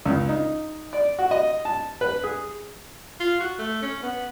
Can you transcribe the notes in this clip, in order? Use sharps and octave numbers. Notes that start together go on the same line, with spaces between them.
C#2
D#4
D5
F#4
D#5
A5
B4
G#4
F4
F#4
A3
C#4
B3